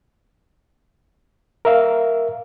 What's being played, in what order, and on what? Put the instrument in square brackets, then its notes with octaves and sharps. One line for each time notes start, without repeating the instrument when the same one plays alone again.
[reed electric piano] A#4 E5 F5